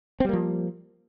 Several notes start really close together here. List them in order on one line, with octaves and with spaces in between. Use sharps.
C4 G3 A#3 F3